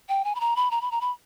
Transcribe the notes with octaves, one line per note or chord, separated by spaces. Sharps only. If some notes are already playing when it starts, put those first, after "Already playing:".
G5
G#5
B5
A#5
B5
A#5
B5
A#5
B5